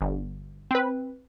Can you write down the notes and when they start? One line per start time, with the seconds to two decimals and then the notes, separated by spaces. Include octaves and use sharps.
0.01 G1
0.71 C4 B4